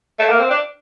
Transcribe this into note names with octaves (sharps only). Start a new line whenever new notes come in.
A3
A#3
C4
D4